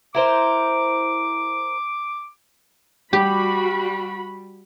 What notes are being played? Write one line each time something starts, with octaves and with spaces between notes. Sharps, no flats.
E4 A#4 C5 D6
G3 F#4 G4 B5